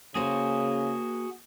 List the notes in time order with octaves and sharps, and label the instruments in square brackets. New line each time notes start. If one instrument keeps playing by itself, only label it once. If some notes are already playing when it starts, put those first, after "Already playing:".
[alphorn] C#3 [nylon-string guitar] A#3 C5 [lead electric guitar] F#4 G#4